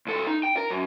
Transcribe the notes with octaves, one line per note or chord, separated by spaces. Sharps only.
C#2 A4
D#4
G5
A#4
F#2